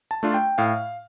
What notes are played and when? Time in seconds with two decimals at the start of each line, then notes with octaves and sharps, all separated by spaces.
0.11 A5
0.23 A3 D4 F4
0.34 G5
0.58 A2 F5